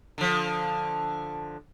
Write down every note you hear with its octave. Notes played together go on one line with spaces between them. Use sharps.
D3 F3